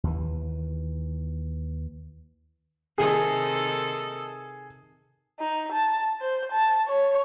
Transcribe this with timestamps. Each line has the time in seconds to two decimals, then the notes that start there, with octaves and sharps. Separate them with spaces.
0.04 D#2 E3
2.98 C3 D#3 G#4 A4
5.40 D#4
5.72 A5
6.21 C5
6.52 A5
6.88 C#5